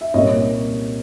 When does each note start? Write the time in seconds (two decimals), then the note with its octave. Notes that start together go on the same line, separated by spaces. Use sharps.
0.01 E5
0.14 C2 A#2 G3 A#3 C#5 D#5